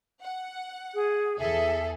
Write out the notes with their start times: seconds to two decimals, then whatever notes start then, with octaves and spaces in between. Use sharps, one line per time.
0.22 F#5
0.94 G#4
1.39 E2 G#4 A4 E5